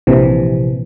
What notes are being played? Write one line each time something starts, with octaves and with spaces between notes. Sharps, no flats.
A#1 C3 E3